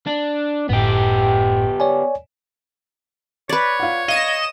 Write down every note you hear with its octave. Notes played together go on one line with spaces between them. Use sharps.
D4
G1 F#2 A2 B3 G4
C#5 D5 G#5
B4 C#5 D5
F4 F#5
D#5 F5 E7